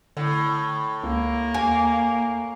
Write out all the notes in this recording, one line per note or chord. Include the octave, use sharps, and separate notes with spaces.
A2 D3
C#2 A#3
D#2 G#5